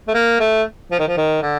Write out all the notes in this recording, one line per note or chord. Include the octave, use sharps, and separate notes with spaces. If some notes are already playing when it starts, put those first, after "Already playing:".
A3
A#3
A3
F3
D#3
F3
D#3
D3